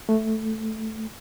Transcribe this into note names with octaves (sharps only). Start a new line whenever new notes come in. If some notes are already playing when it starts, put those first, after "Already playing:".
A3